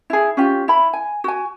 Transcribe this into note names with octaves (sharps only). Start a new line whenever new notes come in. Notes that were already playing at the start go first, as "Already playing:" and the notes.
E4 G#4
C#4 F4 G4
E4 B5
G#5
F#4 G#5